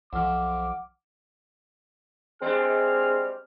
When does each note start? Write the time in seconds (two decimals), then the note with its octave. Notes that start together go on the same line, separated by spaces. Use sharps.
0.13 B1 F2 F3 F#5 D6 F6
2.42 G3 G#3 C4 D4 G#4 F6